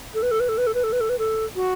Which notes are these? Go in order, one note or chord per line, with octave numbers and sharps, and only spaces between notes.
A4
B4
A4
B4
A4
B4
A4
B4
A4
B4
A4
B4
A4
F#4